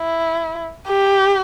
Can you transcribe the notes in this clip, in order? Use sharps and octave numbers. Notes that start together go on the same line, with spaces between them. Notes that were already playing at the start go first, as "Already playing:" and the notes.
Already playing: E4
G4